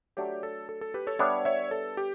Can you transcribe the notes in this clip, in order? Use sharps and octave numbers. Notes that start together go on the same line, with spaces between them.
F#3 A3 D4 G4
A4
A4
A4
G4 B4
A4 C#5
G3 B3 D4 C#5 E5
C#5 E5
A4
G4